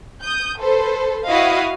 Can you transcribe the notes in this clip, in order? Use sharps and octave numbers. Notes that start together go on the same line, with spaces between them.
D#6 G6
A4 B4 C5
E4 F#4 D#5 F5 D#6